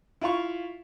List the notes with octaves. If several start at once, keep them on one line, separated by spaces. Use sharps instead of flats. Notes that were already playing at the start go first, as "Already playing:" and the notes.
E4 F4 F5 C#6